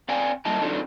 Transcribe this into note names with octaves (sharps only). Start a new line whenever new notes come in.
C4 D5 F5 G5 G#5
G3 A#3 E4 D#5 A5 A#5
F#3 C4 D4 D#4 F4 A4